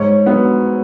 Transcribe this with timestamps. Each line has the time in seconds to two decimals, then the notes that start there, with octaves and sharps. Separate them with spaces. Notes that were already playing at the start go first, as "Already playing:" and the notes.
Already playing: G#2 C#5
0.26 F#3 B3